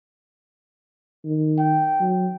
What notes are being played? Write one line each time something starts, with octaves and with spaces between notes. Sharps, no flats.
D#3
G5
F#3